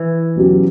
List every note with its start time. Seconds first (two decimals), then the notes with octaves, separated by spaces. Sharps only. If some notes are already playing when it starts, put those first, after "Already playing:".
Already playing: E3
0.36 B2 F#3 C#4 G4